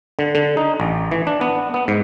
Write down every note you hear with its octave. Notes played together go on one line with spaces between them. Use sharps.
D3
D3
D#4
A1
E3
D4
B3
B3
G#2